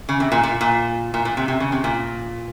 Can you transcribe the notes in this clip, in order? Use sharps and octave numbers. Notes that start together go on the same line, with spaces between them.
C#3
C3
A#2
A#2
A#2
A#2
A#2
C3
C3
C#3
C3
A#2